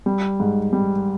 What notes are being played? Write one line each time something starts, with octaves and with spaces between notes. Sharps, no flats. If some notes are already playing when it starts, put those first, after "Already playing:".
G3
G#2
G3